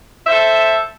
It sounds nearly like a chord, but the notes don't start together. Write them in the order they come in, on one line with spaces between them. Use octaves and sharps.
E5 C5 A4